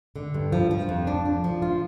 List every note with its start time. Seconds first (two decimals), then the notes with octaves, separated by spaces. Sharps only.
0.16 D3
0.34 G2
0.52 F3
0.71 F3
0.89 F2
1.07 D4
1.25 D4
1.44 F3
1.62 F4